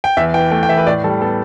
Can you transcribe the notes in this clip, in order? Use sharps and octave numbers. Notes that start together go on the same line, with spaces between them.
G5
E2 E5
E3 G5
A3 G5
G5
E2 E5
B4
A2 D5
G3 A4
B3 A4